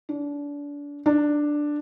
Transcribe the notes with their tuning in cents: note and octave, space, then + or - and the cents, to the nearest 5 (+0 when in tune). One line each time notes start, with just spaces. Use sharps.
D4 -30
D4 +5